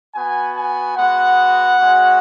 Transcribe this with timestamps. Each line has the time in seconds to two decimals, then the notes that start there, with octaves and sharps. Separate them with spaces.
0.14 B3 F#4 G#5
0.55 G#5
0.96 G#3 B3 F#4 F#5
1.79 G#3 C#4 F#4